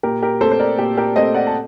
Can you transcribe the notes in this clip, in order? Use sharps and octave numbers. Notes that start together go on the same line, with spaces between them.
A#2 G4 A#4
G4 A#4
A3 C4 A4 C5
C5
A#4 D5
A#2 G4
G4 A#4
A3 C4 C5 D#5
D5 F#5
A5